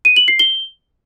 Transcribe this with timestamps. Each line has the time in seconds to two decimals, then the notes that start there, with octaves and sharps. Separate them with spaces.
0.05 D#7
0.16 F#7
0.28 C7
0.39 G7